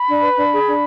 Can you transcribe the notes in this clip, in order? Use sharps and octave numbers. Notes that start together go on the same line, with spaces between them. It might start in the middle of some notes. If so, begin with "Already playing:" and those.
Already playing: B5
D4
B4
D4
G#4
D4